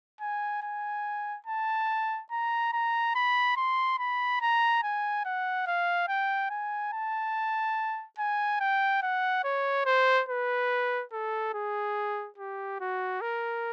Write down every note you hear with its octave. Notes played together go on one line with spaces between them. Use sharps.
G#5
G#5
A5
A#5
A#5
B5
C6
B5
A#5
G#5
F#5
F5
G5
G#5
A5
G#5
G5
F#5
C#5
C5
B4
A4
G#4
G4
F#4
A#4